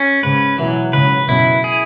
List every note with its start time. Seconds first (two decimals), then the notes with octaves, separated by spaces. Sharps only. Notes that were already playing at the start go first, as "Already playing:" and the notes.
Already playing: C#4
0.23 G#2 C#3 B4
0.58 B2 E3 F#3
0.93 G#2 C#3 B4
1.28 F#2 B2 E4
1.64 G#4